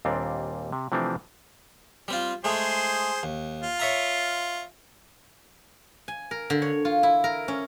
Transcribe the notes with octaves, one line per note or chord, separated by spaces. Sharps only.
D#2 A#2 G3 C4 D4
C3
C3 E3 F3 A3 C4 D4
G3 C4 F4
G#3 A3 G#4 C5
D#2
F4
C#5 E5 A#5
G#5
A#4
D3
C#5
F4
E4
A#4
C#4